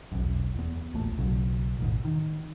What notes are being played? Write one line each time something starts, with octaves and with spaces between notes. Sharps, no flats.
E1 B1 F#2
E2 B3
D1 A1 A#2 A3
B1 C#3 F#3
E1 A1 G#2
D#3